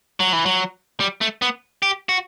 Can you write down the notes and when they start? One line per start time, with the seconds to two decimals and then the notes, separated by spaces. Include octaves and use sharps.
0.20 F#3
0.33 E3
0.46 F#3
1.00 G3
1.21 A3
1.42 B3
1.82 G4
2.09 F#4